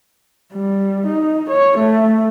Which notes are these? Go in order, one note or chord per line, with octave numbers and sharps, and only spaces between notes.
G3
D#4
C#5
A3